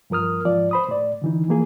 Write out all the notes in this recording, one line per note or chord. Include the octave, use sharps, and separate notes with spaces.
G2 F3 A#4 D#6 F6
G#2 F3 D5
C5 B5 D#6
A2 D5
D3 E3 D#4
E3 F3 A#3 G#4